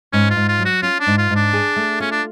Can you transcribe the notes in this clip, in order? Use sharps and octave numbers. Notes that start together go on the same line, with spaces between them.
G#2 C#4
F4
G#2
F4
F#3
F#4
C#4 F4
D4
G#2
F4
G#2
D4
G#4
A3
C#4 F4
D4